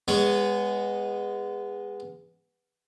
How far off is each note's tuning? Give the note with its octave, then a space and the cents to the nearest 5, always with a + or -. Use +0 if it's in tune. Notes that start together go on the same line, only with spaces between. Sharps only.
G#3 -25 B3 +0 C#5 +10